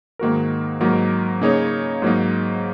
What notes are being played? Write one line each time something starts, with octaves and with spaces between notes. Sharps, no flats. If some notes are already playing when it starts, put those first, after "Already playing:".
G#2 D#3 A#3 F#4 A#4
G#2 F#3 A#3 D#4 A#4
C#3 A#3 D#4 G#4 C#5
G#2 F#3 A#3 D#4